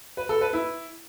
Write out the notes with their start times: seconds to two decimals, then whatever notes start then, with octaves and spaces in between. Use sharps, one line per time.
0.17 B4
0.29 A4
0.41 B4
0.53 E4